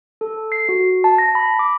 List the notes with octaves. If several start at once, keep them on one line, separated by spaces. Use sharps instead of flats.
A4
C7
F#4
A5
A#6
B5
D6